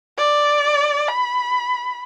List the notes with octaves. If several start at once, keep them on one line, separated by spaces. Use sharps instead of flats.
D5
B5